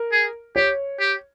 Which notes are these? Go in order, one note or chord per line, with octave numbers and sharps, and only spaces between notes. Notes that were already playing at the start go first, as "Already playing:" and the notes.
Already playing: A#4
G#4
G4 C#5
G4